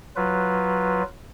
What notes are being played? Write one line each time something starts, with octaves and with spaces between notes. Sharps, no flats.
F#3 F4 B4